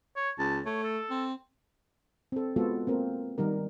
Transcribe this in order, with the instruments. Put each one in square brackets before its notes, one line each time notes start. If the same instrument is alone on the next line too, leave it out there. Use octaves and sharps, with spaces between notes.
[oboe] C#5
[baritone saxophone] C#2 [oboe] A5
[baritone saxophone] A3 [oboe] C#5
[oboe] A4
[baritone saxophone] C4
[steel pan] C4 A4
G#3 B3 F4 F#4 A4
A#3 C4 A#4
D#3 G3 D#4 A#4